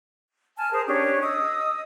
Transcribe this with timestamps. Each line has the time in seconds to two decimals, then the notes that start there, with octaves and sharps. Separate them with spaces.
0.56 G#5 A5 F6
0.73 G#4 A#4 C5 D#6
0.87 C#4 D4 G4 C#5
1.23 D#5 D#6 E6